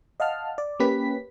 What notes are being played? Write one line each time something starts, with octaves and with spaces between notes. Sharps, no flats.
D#5 F5 F#5 A5 F6
D5
A#3 C#4 G4 B4 B6